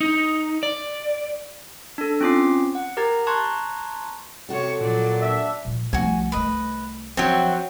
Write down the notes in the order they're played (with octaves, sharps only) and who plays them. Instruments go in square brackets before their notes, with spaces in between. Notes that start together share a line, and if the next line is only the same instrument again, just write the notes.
[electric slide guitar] D#4
D5
[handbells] D4 A4
C4 C#4 F4 D6 C7
F#5
G4 A#4 A#5 G#6 A6
A5 A#5 C6 C#6 F#6 G#6
[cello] C3 C#5 [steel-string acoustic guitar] F#4 A4
[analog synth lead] A#2 [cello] F#3 D5
[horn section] D4 E5
[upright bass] A#2 F3
[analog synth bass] C2 [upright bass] F3 A3 [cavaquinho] F#4 G#5
[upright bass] D#3 A3 [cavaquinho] B4 D#5
[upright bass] F3 [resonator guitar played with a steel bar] F#3 C4 [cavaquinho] C#5 E5 G5